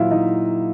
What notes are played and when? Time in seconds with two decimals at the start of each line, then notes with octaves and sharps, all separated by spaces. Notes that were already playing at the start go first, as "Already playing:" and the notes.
Already playing: A#2 F#3 E4 F4 E5 F5
0.11 F#3 D#4 D#5